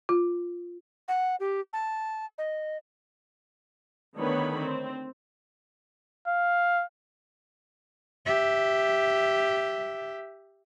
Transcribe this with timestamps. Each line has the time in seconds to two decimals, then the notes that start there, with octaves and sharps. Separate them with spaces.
0.09 F4
1.08 F#5
1.40 G4
1.73 A5
2.38 D#5
4.17 D3 D#3 A3 B3 C#5 B5
4.59 C4
6.28 F5
8.26 G4 E5